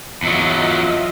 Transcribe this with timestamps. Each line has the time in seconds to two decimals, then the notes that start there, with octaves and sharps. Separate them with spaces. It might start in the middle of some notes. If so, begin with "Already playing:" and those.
0.23 E2 F#3 F4 D#5 E5